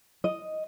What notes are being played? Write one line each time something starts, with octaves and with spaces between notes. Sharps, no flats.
D#5